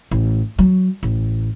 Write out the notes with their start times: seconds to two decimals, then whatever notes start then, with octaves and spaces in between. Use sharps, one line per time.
0.11 A1
0.59 F#3
1.03 A1